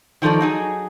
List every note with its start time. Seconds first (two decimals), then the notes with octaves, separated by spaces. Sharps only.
0.22 D#3 F3 D#4 A4 D5
0.40 F#3 D#4 G#4